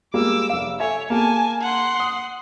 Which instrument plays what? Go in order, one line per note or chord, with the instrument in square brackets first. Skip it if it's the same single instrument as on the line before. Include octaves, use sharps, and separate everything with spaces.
[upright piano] G3 G#3 A#3 [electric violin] D6 E6
[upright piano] F1 F5
[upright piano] A4 E5 G#5 [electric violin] C#5
[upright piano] A#3 G#4 [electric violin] G#5 A5
[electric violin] F#5 C6
[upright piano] D#6